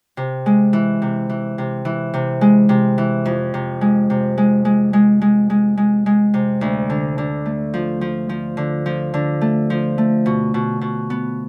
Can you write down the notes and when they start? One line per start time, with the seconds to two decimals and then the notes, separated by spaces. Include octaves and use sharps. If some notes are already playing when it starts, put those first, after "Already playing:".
0.17 C3
0.46 G#3
0.73 E3
1.02 C3
1.29 E3
1.58 C3
1.85 E3
2.14 C3
2.41 G#3
2.69 C3
2.98 E3
3.25 F2
3.54 C3
3.81 G#3
4.10 C3
4.38 G#3
4.65 G#3
4.93 G#3
5.21 G#3
5.50 G#3
5.77 G#3
6.06 G#3
6.34 C3
6.61 D2
6.90 D3
7.18 D3
7.46 A3
7.74 F3
8.01 F3
8.29 F3
8.57 D3
8.86 F3
9.14 D3
9.41 A3
9.70 F3
9.98 A3
10.26 B2
10.54 B2
10.81 B2
11.10 B3